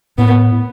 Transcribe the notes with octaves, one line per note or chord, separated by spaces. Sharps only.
A2 B3